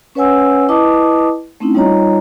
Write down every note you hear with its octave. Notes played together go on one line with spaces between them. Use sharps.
C#4 B4 C#5 F#5 G#5 E6
E4 B4 D#5 A5 D6 D#6
A3 C4 C#4 D#4 E4
G3 D#4 F4 C#5 D#5 A#5